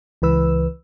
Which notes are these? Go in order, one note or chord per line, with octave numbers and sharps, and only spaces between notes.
C#2 E3 B4 E6